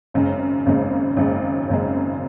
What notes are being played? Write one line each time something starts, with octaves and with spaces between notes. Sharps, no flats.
G#1 F#2 C#3 G#3
G#1 F#2 C#3 G#3
G#1 F#2 C#3 G#3
G#1 F#2 C#3 G#3